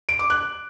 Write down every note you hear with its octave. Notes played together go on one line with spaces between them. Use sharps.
D7
D6
F#6